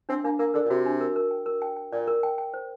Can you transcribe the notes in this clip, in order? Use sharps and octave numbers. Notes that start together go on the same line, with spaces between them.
C4 D4
A#3 D4
A#3 A#4
D3 A#4
A#2
C3 F#4
D4
A#4
A#4
G5
A#4
G5
G5
A#2 D5
A#4
G5
G5
C5